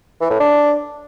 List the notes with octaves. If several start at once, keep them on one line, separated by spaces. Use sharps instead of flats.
E3
A2
D4